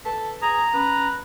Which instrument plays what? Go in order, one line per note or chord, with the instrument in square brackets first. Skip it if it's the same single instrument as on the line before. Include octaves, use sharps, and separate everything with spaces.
[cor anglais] A4 [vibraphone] B4
[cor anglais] G#4 [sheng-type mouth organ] A#5
[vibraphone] C#4 [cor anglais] B4